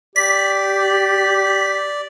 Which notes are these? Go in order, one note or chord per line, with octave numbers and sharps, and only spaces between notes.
G4 D5 B6